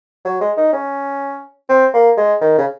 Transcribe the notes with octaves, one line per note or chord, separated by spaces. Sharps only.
F#3
G#3
D#4
C#4
C4
A#3
G#3
D#3
C#3